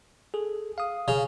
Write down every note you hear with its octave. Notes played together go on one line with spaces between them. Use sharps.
G#4 A4
F5 D#6
C#3